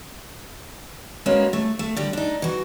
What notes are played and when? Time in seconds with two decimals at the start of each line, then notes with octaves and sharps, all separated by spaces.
1.26 G#3 A#3 B3 C#4 F#4
1.53 A3
1.79 A3
1.97 D3 G3
2.13 D4 D#4
2.42 E3 F#4